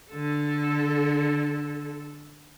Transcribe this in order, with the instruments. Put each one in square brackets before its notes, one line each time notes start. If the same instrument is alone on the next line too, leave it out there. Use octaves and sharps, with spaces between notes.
[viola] D3 A4